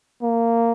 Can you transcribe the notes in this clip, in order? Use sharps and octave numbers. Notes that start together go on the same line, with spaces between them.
A#3